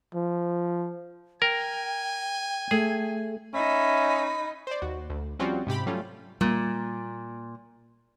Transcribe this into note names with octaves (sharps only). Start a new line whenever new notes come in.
F3
A#4 G5 G#5
A3 G#4
C#4 D#4 E5 B5
C5 D5
D#2 F#4
D2
F3 G3 C4 C#4 F4 F#4
G#2 C3 G4 B5
F#3 G3 A3 C#4 F4
A#2 G3 A#3